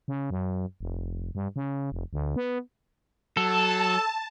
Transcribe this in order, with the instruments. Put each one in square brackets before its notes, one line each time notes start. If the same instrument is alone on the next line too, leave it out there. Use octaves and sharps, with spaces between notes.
[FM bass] C#3
F#2
F1
G2
C#3
F1
D2
B3
[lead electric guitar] F#3 [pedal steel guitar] A4 [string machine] A5